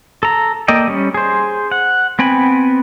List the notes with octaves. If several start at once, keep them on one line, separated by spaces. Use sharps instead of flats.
A4 A#5
A#3 A4 D5 D#5 G5
G3 C#4
G#4 C5
F#5
B3 C4 G5 G#5 B5